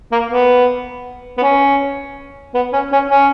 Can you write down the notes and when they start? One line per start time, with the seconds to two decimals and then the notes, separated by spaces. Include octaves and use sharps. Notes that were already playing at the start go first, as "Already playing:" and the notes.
0.12 A#3
0.31 B3
1.38 B3
1.42 C#4
2.55 B3
2.73 C#4
2.92 C#4
3.10 C#4